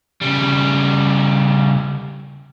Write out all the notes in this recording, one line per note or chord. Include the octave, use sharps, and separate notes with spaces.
C#3 G3